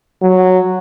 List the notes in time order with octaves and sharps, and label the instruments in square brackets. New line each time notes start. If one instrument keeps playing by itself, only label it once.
[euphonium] F#3